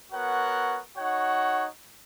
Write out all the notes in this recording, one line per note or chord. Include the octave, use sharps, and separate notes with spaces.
B3 F#4 A#4 C#5 F#5
D#4 F#4 C#5 F#5